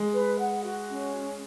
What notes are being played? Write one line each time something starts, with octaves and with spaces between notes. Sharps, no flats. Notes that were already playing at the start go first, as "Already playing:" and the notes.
Already playing: G#3
B4
F#5
F#4
C#4